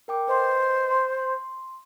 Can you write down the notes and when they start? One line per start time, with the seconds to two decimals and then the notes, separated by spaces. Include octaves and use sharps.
0.08 A#4 G5 D6
0.28 B4 C5 D#5 C6
0.91 C6
1.19 C6